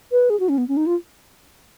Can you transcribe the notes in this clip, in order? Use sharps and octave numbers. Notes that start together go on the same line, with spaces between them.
B4
G#4
F#4
C#4
B3
C#4
D#4
F4